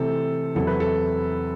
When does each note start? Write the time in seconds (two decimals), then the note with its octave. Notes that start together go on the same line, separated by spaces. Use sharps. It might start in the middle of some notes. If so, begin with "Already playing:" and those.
Already playing: C3 E3 A3 C4 A4
0.55 E2 C3 F#3 C4 E4 A4
0.67 B4
0.80 A4